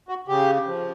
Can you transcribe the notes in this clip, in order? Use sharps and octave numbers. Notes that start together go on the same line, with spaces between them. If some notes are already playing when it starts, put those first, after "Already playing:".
F#4
C#3 G4
F3